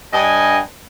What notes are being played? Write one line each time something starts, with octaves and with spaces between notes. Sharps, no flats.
G2 D#5 G#5